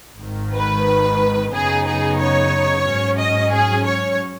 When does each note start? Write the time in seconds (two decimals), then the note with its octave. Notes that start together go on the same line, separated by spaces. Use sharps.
0.19 G#1 G#2 D#3
0.54 B4
1.52 F#2 C#3 B3 D#4 G#4
1.86 G#4
2.19 C#5
2.86 G#2 F#3 C#4
3.19 D#5
3.52 G#4
3.85 C#5